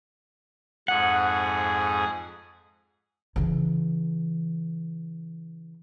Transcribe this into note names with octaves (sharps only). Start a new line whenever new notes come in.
F2 G#2 G#4 F#5
C#3 E3